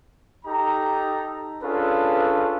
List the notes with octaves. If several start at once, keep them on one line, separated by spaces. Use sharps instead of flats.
D#4 G4 A4 A#5
C#4 D4 F4 G#4 A4 B4